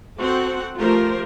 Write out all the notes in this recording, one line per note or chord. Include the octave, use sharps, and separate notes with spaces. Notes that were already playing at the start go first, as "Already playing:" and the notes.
C4 F#4 A4 F#5
F3 A3 F4 G4 A#4 C5